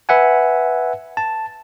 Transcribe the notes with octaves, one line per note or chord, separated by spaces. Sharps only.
B4 E5 F#5 G#5
A5